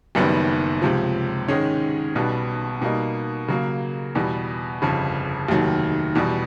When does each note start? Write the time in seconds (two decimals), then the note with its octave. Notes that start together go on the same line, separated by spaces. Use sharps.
0.15 F#1 F#2 D#3 G3 B3
0.82 C#2 C3 F3
1.48 G#2 D#3 G#3 C#4
2.15 B1 B2 G3 B3
2.82 B2 G3 A#3 D#4
3.48 C#3 F#3 A#3
4.15 E2 B2 G3
4.82 G1 F2 C#3
5.49 F1 D#2 D#3 F#3
6.15 E2 B2 G3